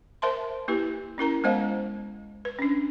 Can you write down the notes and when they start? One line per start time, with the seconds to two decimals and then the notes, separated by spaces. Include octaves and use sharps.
0.22 A#4 C5 E5 A5 C6
0.68 A#3 E4 G4 B4
1.18 C#4 E4 A#4 A#5
1.44 G#3 B3 C5 D#5 F5 F#5
2.45 B4
2.59 C#4 D4